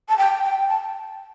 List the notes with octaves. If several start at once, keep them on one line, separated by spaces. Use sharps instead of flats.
A5
G5
G5
A5